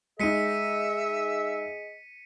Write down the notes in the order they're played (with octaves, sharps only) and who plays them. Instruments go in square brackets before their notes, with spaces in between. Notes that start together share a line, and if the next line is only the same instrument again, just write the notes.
[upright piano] G#3 D#4 [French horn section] G#4 D#5 [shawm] E5 [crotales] B6 C#7 D#7